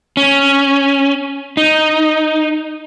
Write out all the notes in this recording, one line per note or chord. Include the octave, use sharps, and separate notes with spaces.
C#4
D#4